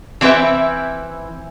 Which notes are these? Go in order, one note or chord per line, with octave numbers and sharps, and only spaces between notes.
E3 C4 E4 B4 E5